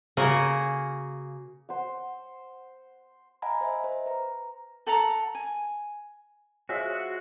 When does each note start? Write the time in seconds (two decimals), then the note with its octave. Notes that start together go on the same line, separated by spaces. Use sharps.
0.17 C#3 A#3 F#4 G#4 A#4
1.69 C5 F#5
3.42 D#5 F5 F#5 G#5 A#5 B5
3.61 C5 D#5 E5
3.84 C5
4.06 B4 A#5
4.87 A4 F#5 A5 A#5
5.35 G#5
6.69 G#3 F4 F#4 C5 C#5 E5